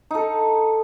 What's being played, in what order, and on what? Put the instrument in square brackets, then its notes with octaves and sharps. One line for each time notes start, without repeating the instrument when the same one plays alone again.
[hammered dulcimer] D#4 A4